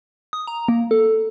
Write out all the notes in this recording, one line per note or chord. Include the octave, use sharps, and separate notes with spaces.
D#6
A#5
A#3
A4